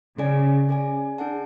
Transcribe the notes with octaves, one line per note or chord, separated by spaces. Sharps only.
C#3 C#4 G#4 D5 G#5
C#4 G#4 D5 G#5
D4 G#4 D5 F#5 A5